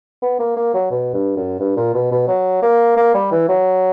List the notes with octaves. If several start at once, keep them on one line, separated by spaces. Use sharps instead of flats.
B3
A#3
A#3
F#3
B2
G2
F#2
G2
A#2
B2
B2
F#3
A#3
A#3
G3
E3
F#3